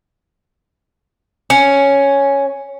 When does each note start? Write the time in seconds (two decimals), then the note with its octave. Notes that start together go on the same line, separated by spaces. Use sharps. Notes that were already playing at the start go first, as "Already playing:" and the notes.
1.50 C#4